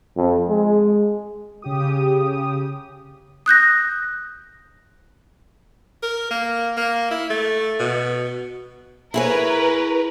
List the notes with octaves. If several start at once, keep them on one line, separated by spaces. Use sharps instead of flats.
F2
G#3
C#3 G4 D#6
D#6 F#6 G6 A#6
A#4
A#3
A#3
E4
A3
B2
E4 G#4 A#4 B4 C#5